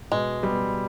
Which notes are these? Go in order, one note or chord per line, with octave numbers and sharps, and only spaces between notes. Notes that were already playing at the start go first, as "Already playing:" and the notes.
B2 G#3
G3 B3